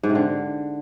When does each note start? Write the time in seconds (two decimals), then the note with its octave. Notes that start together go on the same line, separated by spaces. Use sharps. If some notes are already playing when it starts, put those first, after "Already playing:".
0.03 G#2
0.09 C3
0.15 D3